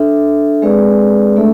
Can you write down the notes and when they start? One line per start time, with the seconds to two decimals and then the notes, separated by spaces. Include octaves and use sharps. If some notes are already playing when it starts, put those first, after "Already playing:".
Already playing: D4 A4 E5
0.62 G#3 C4 G#4 B4 D5
1.37 A3 D4 A4 E5